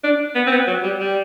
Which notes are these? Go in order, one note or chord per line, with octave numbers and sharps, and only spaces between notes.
D4
B3
C4
B3
F#3
G3
G3